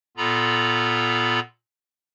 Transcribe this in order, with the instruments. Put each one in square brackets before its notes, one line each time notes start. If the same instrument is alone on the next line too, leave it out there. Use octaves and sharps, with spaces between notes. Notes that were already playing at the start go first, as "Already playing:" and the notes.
[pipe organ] A#2 B3 F4 A4 A#5 B5